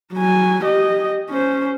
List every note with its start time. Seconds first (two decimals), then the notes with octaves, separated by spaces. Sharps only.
0.14 F#3 G#5
0.64 G4 D#5
1.30 C#4 C5